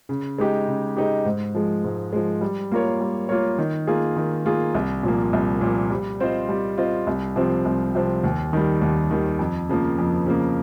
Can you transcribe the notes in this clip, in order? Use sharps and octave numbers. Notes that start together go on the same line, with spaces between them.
C#3
G#3 D#4 G4
C#3
G#3 D#4 G4
G#2
F3 G#3
G#2
F3 G#3
G3
A#3 F4 A#4 C#5
G3
A#3 F4 A#4 C#5
D#3
A#3 F4 G#4
D#3
A#3 F4 G#4
C2
A#2 F3 A#3
C2
A#2 F3 A#3
G3
C4 F4 C5 D#5
G3
C4 F4 C5 D#5
C2
C3 F3 C4
C2
C3 F3 C4
D#2
D#3 G3
D#2
D#3 G3
F2
C#3 F3 A#3
F2
C#3 F3 A#3